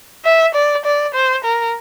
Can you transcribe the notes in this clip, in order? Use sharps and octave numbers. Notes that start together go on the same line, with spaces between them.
E5
D5
D5
C5
A#4